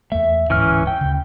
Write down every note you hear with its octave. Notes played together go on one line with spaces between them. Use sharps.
E2 A3 E5
D1 G#2 E3 C#4 F6
G5
D2 C#3